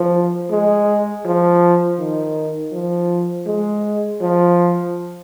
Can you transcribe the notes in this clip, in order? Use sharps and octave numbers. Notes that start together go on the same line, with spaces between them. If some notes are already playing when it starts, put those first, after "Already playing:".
Already playing: F3
G#3
F3
D#3
F3
G#3
F3